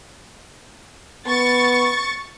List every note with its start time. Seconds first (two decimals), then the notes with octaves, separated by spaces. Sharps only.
1.27 B3 C#6 A6